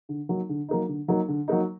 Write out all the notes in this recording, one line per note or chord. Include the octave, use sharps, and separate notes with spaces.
D3
F#3 A#3 D#4
D3
F#3 A#3 D#4
D3
F#3 A#3 D#4
D3
F#3 A#3 D#4